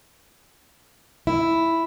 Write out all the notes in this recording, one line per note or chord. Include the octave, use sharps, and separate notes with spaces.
E4